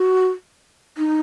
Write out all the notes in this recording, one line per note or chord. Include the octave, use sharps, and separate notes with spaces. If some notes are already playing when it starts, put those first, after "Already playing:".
Already playing: F#4
D#4